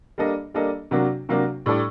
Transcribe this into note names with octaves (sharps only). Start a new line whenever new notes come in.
G3 A#3 D4 A4 D#5
G3 A#3 D4 A4 D#5
C3 F#3 A#3 D4 F#4
C3 F#3 A#3 D4 F#4
A2 G3 D4 A4 D5